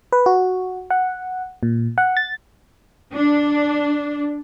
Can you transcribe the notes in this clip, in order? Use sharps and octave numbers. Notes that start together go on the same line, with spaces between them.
B4
F#4
F#5
A#2
F#5
A6
D4